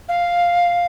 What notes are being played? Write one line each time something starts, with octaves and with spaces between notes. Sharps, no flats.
F5